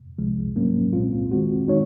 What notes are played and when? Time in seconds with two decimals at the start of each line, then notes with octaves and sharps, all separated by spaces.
0.18 C2 C3 F3 G#3
0.56 G#2 F#3 A#3 C#4
0.93 C2 A#2 G#3 C4 F4
1.31 D#3 G#3 C4 F#4
1.68 D#3 G#3 D#4 F#4 C#5